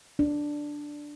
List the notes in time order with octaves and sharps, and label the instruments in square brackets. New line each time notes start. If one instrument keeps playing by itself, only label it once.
[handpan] D4